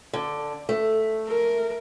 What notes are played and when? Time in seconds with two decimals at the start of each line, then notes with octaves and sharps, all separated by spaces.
0.13 D3
0.69 A3
1.28 A#4